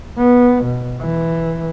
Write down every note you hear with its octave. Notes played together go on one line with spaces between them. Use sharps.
B3
B2
E3